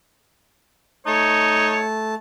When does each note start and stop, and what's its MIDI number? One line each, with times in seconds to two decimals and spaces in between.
1.07 2.15 57
1.07 1.78 63
1.07 1.81 73
1.07 2.15 81